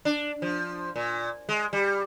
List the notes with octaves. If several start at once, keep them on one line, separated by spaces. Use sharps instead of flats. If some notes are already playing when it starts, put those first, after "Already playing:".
D4
F3
A#2
G#3
G3